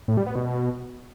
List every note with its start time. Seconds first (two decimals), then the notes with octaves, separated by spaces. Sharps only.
0.08 A2
0.17 G3
0.26 B3
0.36 B2